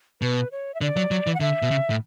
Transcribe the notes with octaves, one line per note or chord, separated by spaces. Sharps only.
B2 B4
C#5
E5
D3 D5
F#3
F#3
E3
F#5
D3 E5
B2
C#3
A2